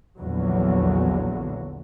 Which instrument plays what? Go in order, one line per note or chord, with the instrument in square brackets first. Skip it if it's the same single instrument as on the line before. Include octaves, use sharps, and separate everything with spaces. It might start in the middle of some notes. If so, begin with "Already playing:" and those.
[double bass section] A#1 E2 D3 F#3